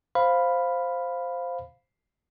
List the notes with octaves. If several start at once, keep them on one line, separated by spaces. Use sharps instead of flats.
C5 F5 B5